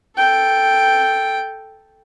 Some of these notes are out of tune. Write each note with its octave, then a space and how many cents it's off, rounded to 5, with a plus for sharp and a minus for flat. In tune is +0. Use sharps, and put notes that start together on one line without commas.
A4 +0 G5 +0